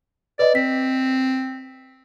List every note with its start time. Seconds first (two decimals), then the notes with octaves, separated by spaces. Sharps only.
0.39 B4 D5 D#5
0.55 C4 B6